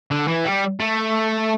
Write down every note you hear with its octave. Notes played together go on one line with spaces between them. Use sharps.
D3
E3
G3
A3